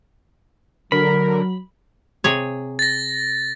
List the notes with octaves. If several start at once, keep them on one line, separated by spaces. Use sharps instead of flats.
D3 F#3 A#4 B5
C3 G#4 C#5
A6 A#6